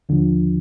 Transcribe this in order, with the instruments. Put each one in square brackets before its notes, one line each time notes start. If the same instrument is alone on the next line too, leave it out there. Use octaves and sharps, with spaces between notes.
[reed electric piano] D#2 D3 F3